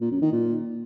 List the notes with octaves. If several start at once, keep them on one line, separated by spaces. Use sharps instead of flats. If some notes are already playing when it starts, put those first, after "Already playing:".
A#2
F#2
D#3
A#2